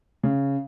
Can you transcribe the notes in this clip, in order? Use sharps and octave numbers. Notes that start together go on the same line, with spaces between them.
C#3